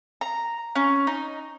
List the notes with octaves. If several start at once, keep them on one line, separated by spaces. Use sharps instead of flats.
A#5
C#4
D#4